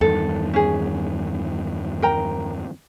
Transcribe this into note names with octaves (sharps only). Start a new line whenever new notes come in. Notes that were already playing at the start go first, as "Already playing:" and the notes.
E2 G2 D#3 A4
C#4 G#4
A#4 G5 A#5